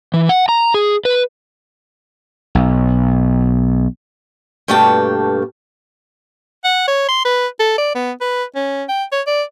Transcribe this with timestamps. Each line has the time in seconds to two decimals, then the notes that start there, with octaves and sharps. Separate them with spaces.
0.14 E3
0.29 F#5
0.49 A#5
0.74 G#4
1.05 B4
2.55 B1
4.68 G2 B2 A3 A#3 G5 A5
6.65 F#5
6.88 C#5
7.08 C6
7.25 B4
7.60 A4
7.78 D5
7.95 B3
8.21 B4
8.55 C#4
8.89 G5
9.12 C#5
9.27 D5